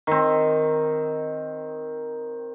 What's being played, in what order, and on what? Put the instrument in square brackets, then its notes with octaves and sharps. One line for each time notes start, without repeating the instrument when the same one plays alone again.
[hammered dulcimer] D#3 C4